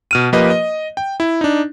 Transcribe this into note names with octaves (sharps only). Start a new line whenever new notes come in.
B2 F6 D#7
F3 A#3 G4 B4 D#5
D#5
G5
E4
D4 D#4